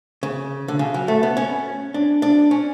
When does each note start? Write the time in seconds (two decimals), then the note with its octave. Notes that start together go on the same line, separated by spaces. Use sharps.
0.23 C#3
0.68 D3
0.79 C#3
0.94 F#3
1.08 A3
1.23 B3
1.37 C#4
1.94 D4
2.22 D4
2.51 C#4